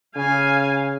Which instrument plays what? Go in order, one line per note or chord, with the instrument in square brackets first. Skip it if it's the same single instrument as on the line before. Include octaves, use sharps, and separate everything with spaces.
[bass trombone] C#3 [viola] F5 G#5